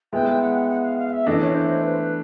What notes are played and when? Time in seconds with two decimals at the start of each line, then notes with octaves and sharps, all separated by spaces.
0.12 G#3 B3 E4 G5
0.41 F#5
0.69 F#5
0.84 F5
0.98 F5
1.13 E5
1.27 E3 A3 D4 D#5
1.41 C#5
1.54 C5
1.69 C5
1.84 B4